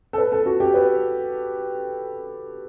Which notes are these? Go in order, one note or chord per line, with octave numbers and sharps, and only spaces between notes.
A4
B4
A4
F#4
G4
B4